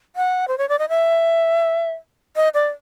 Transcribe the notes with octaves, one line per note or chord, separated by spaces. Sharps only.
F#5
C5
C#5
D5
D#5
E5
D#5
D5